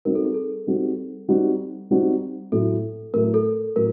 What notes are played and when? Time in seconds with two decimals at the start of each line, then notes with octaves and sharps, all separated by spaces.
0.05 G3 C4 D#4 F#4 A#4
0.15 A4
0.25 G#4
0.34 A4
0.67 G3 C4 D#4 F#4
1.28 G3 C4 D#4 F#4
1.91 G3 C4 D#4 F#4
2.52 A2 F#3 A3 A4
3.13 A2 F#3 A3 A#4
3.34 A4
3.76 A2 F#3 A3 A#4